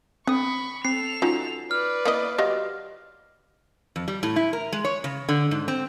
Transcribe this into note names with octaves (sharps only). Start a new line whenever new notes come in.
D3 C4 B5 C#6 D#6
C4 A4 C7 F7
F#3 C#4 D#4 F4
B4 D5 F6
A#3 E4 D#5
F#3 F4 G4 D#5
F2
G3
A2
E4
A#4
G#3
C#5
C#3
D3
G#2
C4